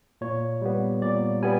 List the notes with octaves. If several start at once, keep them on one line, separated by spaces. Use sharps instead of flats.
A#2 C#5
G3 B3
A#2 D5
G3 B3 G#5